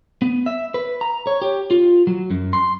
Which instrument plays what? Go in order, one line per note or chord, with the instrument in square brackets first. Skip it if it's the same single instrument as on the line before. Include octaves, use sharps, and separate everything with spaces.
[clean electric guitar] B3
E5
B4
A#5
C#5
G4
F4
F#3
F#2
C6